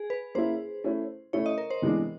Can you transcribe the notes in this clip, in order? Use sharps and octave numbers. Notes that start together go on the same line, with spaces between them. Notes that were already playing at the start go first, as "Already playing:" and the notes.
Already playing: G#4
B4
A#3 C#4 E4 C5
A3 C#4 E4
A3 C#4 E4 C#5
D#5
A#4
C5
C3 E3 G#3 B3 D4